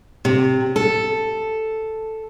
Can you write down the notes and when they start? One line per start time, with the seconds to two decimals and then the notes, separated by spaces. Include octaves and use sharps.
0.25 C3
0.76 A4